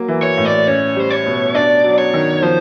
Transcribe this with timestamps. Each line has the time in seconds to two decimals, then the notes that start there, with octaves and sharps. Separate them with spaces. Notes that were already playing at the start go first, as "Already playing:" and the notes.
Already playing: F#3 A#3
0.08 E3
0.23 C#5
0.37 A2
0.45 D5
0.67 C#4 C#5
0.96 G3 C5
1.11 C#5
1.26 B2
1.55 D4 D5
1.84 F#3
1.98 C#5
2.14 D#3
2.42 F3 C5